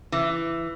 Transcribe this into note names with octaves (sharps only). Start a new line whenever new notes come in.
E3